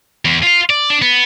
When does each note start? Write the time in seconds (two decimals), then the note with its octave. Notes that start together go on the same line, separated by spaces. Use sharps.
0.25 E2
0.43 F4 F5
0.70 D5
0.90 D4
1.02 B3